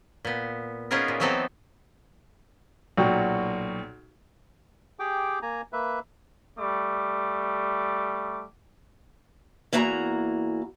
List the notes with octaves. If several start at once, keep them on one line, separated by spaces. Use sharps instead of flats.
A#2 B3
B3 C#4 D#4 F4 G#4 A#4
A#2
E3 F#3 B3 C4 D#4 A4
B1 A#2 F#4 G5
G4 G#4 G5 D6
A#3 G#5 A#5
A#3 B4 E5
G3 A3 D6
E2 A#3 E4 F#4 A5 A#5